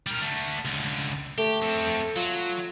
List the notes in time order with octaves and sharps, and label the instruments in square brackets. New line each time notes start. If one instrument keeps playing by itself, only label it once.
[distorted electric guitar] G3 A#4
D3 A3
C#2 D3
[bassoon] A3 [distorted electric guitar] G4
[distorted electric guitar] C4 A4
[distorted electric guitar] F#3 [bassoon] F4